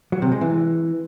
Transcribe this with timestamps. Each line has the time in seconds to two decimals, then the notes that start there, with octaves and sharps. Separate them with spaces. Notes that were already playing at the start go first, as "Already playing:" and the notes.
0.12 F#3
0.22 C3
0.32 G#3
0.41 E3